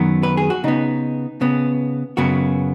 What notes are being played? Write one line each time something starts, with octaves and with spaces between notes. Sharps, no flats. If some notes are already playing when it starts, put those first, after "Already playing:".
Already playing: F#2 D#3 F#3 B3
B4
G#4
F#4
C#3 B3 D#4
C#3 B3
F#2 C#3 F#3 B3 F#4